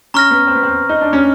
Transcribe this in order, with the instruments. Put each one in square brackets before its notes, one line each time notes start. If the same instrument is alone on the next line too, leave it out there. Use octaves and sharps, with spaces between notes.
[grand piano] C#4 [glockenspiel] A#5 C#6 F6 A#6
[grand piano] B3
C4
B3
C4
D#4
D4
C#4